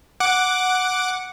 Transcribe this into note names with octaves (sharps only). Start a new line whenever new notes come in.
F#5 D6